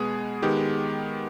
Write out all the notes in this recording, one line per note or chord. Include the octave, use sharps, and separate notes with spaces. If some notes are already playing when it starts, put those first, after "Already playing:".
Already playing: B2 G#3 B3 G#4
D#3 G#3 B3 G4